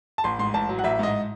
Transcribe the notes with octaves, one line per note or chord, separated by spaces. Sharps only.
A5
A1 C6
G#2 C6
A1 A5
F#3
F#5
A1 E5
G#2 D#5